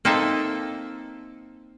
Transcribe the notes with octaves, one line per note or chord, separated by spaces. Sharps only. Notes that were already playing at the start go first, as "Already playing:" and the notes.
A#3 C4 D#4 A4 E5 A5